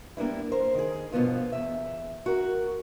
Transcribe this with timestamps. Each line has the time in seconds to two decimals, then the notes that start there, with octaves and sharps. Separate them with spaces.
0.17 G3 A#3 B3 D4 E4
0.52 A#4 C5
0.75 D#3 G#4
1.12 G2 B2 D#3 F3 B3 F4
1.52 E2 E5
2.26 F#4 A#4